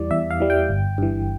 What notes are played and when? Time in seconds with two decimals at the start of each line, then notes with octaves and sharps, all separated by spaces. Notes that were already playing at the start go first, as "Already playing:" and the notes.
Already playing: E2 E3 G3 D5
0.11 E2 E5
0.31 F5
0.40 E3 G3
0.50 G5
0.69 G1
0.98 G2 E3